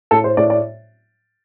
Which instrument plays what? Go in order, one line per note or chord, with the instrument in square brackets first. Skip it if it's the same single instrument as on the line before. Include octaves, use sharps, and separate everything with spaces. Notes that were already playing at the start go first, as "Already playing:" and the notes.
[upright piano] A2 A4
C5
A2 D5
D5